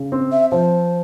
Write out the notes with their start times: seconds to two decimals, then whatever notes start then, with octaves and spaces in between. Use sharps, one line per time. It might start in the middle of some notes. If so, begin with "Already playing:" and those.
Already playing: C#3
0.12 C4
0.32 E5
0.51 F3 C5